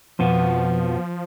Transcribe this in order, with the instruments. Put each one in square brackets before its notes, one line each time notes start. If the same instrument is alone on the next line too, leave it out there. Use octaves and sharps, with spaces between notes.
[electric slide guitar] F2 B2 B3 [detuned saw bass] F3